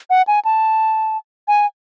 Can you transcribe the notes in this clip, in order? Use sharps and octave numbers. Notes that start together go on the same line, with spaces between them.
F#5
G#5
A5
G#5